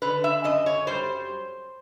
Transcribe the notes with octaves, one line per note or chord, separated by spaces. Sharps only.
D3 B4
E5
F#2 D#5
C#5
G3 C5